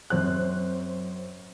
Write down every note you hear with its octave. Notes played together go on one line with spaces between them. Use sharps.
F#2 C4 F#6